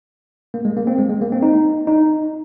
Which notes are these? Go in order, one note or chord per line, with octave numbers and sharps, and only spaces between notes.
A#3
G#3
A#3
C4
G#3
G#3
A#3
C4
D#4
D#4